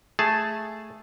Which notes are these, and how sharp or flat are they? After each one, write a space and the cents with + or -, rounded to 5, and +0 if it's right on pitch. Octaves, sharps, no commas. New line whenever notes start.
A3 +0 G#4 +0 A5 +0